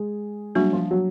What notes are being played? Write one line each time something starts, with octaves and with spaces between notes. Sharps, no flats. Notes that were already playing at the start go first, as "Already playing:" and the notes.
Already playing: G#3 G#4
F#3 G3 A#3 D4 F#4
F3 F4
F#3 F#4